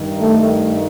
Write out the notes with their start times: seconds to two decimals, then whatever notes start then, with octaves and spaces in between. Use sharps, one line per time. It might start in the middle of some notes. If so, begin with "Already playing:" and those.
Already playing: G2 D#3
0.20 A3